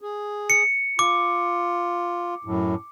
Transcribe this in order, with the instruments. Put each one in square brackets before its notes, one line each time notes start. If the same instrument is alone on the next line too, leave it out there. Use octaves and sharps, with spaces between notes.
[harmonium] G#4
[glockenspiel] C#7
[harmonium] F4 [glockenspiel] D6
[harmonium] F#2 A2